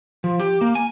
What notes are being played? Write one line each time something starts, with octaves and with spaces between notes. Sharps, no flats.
F3
G4
A#3
G#5